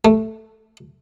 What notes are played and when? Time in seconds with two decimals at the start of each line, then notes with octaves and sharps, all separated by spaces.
0.05 A3